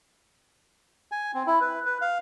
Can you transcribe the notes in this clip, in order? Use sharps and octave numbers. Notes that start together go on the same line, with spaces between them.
G#5
C4
E4
B4
B4
F5